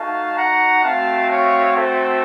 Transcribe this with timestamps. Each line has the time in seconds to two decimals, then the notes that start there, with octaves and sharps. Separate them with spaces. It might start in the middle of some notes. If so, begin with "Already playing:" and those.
Already playing: A3 D#4 F#4 F5 A5
0.36 F#5 A#5
0.83 A3 C4 F#4 F5 A5
1.29 C#5 F5
1.76 A4 C5